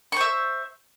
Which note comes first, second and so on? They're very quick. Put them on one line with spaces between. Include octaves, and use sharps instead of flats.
C#6 C5 E5